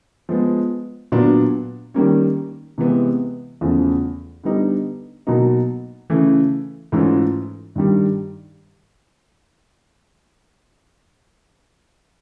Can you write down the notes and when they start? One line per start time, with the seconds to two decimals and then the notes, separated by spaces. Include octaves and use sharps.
0.29 F3 G#3 B3
1.12 A#2 F#3 B3 D4
1.94 D#3 G3 A#3 C#4
2.78 C3 E3 G#3 B3
3.61 E2 C#3 F3 A3
4.44 D3 G3 B3 D#4
5.27 B2 F#3 A#3 D#4
6.10 C#3 E3 A3
6.92 G#2 E3 A3 C#4 F4
7.76 G2 D#3 G3